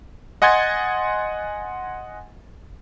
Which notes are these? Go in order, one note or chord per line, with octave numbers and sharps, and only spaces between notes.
D#5 F#5 G#5 C6 G#6 A6